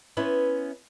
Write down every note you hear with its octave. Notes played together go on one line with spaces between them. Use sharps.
B3 C#4 E4 B4 C5